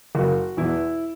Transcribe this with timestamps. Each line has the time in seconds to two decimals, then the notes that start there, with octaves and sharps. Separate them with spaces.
0.15 F#1 F#4
0.57 E2 B2 E4